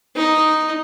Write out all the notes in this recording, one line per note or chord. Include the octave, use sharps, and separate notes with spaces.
D#4